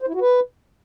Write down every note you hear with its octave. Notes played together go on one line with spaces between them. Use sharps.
C5
E4
F#4
B4